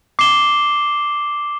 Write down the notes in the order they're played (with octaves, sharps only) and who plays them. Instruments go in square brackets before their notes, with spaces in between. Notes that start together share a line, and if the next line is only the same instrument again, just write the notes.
[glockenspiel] D6 C7 E7 G7